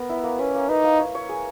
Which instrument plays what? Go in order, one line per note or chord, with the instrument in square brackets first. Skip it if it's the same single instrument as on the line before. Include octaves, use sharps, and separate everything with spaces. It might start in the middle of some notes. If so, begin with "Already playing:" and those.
Already playing: [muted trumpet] B3 [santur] A#4
[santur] E4
A#3
[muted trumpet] C#4 [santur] B4
[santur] A#3
[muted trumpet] D#4 [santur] B4
[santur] A#3
C#5
C#5
G#4